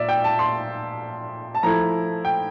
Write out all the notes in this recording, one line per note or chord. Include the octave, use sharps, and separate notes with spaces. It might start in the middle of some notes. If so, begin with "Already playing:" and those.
Already playing: A#2 D5 E5
G5
A5
C6
A5
F3 A3 E4 A#5
G5